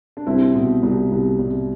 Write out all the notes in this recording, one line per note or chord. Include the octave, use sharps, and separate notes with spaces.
D4
C2 C4 E4
B2
C2
C2
C2